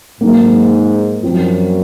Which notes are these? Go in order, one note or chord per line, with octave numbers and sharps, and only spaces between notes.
G#2 F#3 A#3 D#4
F#2 F3 C4 F4